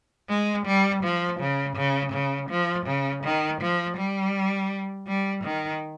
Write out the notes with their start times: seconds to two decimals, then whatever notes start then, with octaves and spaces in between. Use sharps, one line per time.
0.29 G#3
0.66 G3
1.03 F3
1.40 C#3
1.76 C#3
2.13 C#3
2.50 F3
2.86 C#3
3.24 D#3
3.61 F3
3.97 G3
5.08 G3
5.44 D#3